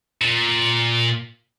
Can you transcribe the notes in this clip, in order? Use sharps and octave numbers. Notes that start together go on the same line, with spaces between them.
A#2